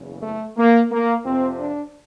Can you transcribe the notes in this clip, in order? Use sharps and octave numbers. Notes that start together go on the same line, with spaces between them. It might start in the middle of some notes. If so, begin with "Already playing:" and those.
Already playing: F#1 E2 C#3
A3
A#3
A#3
F2 C3 F3 C4
D4